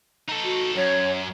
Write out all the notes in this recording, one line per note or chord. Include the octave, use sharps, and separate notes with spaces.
D#4 A4
F#4
F#2 C#5